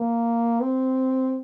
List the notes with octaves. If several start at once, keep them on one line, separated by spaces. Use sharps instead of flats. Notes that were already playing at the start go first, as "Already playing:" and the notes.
Already playing: A#3
C4